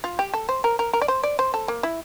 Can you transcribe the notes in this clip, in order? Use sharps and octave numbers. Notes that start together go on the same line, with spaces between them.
F4
G4
A4
C5
A#4
A#4
A#4
D5
C5
D5
C5
A4
A#3
E4